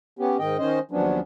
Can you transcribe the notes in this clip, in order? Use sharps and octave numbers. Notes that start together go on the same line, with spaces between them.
B3 C#4 G4
G#2 D#3 D#5 G5
D#3 C#4 C5 D#5
D#2 F3 F#3 B3 C#4 D4